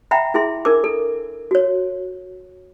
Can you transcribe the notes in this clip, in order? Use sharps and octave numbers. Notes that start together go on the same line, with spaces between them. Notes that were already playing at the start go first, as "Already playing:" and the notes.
E5 F#5 G5 A#5 B5
E4 G#4 E5 C6
D4 A#4 D6
A4
F#4 C#5